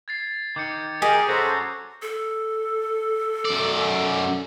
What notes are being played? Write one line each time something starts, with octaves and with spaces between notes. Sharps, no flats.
G#6 A6 C7
D#3 D6 G6 C#7
G4 G#4 A#4 D#5
C#4 F#4 A4 C5 A#5
A4
F#2 D5